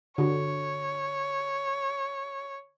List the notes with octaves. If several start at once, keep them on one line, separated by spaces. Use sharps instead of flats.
D3 F#4 C#5